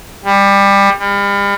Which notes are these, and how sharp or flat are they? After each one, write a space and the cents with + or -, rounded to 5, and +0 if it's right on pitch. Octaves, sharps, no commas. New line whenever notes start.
G3 +20
G3 +40